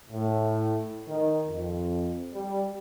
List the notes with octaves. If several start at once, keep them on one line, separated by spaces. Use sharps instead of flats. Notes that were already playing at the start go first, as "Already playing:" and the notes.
A2
D#3
F2
G3